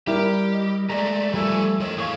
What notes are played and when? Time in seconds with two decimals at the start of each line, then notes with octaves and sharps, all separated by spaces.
0.07 G3 E4 G4 A#4
0.51 D#5
0.90 G#3 A3 D5 A#5
1.34 F3 G3 A3 A4 E5 G#5
1.80 F2 A#4 C#5 D#5
1.98 E3 A3 G#4 F5 C#6